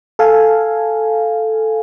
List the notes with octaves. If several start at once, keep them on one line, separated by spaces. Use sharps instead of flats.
A4 F5 G#5